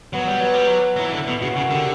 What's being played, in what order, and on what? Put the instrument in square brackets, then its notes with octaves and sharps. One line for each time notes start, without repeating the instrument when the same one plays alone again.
[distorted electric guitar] F#3 [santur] B3
[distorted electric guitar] G3
F#3
G3
F#3
[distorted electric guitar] F#3 [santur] E4
[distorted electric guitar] E3
D3
B2
[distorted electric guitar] C#3 [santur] F#4
[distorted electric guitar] C#3 [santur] C#5
[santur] A#4
[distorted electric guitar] D3 [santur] G4